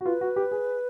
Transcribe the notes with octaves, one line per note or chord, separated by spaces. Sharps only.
F#4
F4 B4
F#4
G4
G#4